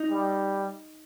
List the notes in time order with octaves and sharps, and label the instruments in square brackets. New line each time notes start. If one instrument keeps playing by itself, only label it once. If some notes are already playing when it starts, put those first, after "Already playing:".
Already playing: [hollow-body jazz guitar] D#4
[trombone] G3